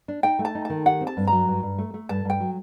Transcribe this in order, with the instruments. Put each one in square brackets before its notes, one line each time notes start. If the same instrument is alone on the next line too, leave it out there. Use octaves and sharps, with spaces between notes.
[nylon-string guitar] D4
[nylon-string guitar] D#4 [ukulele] G5
[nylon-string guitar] A3
[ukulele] A5
[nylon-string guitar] D#4
[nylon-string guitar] D#3 [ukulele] A5
[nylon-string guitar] G4 [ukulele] F#5
[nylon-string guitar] C4
[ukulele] A5
[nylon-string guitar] G2
[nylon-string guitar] F#3 [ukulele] A#5
[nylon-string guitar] G2
G2
A3
A3
[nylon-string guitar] G2 [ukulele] A5
[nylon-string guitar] G2 [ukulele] G5
[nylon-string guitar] F#3